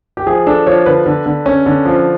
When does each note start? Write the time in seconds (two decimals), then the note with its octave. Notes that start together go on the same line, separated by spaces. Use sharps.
0.17 G4
0.27 F3 G#4
0.47 D4 A4
0.66 F3 C#5
0.86 D3 B4
1.06 D3
1.26 D3
1.46 C#4
1.66 D3
1.85 F3